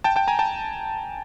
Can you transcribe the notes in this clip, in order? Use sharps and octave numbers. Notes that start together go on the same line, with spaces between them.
G5 A5
G5 A5
G#5 A#5
G5 A5